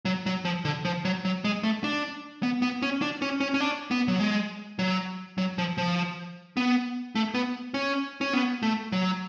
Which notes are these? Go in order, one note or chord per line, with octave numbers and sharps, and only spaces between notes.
F#3
F#3
F3
D3
F3
F#3
F#3
G#3
A3
D4
B3
B3
C#4
D4
C#4
C#4
C#4
D4
B3
F#3
G#3
F#3
F#3
F3
F3
B3
A3
B3
C#4
C#4
B3
A3
F#3